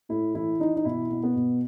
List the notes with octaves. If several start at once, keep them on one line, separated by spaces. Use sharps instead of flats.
A2 E4
E3 E4
E3 D#4
D#4
B2 E4
B2
B3
B2